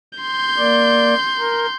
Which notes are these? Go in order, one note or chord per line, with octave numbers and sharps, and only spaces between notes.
C6 G6
A#3 D5
A#4